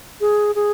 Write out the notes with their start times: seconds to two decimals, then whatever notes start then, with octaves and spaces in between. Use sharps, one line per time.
0.21 G#4
0.55 G#4